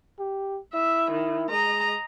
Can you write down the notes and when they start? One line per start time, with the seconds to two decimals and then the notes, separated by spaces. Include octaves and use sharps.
0.19 G4
0.74 E4 E5
1.11 D#3
1.50 G#3 D#5 A#5